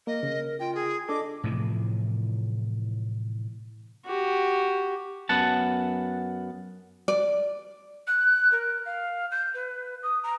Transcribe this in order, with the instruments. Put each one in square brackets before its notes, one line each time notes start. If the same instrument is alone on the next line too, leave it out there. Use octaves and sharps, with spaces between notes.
[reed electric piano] A#3 [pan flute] A#4 [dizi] D#5
[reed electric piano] C#3
[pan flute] F4 [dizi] G5
[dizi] G#4
[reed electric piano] D4 A4 [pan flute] D#5 [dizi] D6
[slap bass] A2 C3 E3 F3
[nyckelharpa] F#4 G4
[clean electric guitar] F#2 B3 F#5 A5
[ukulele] D5
[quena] F#6
A#4
F5
G6
B4
D#6
A#5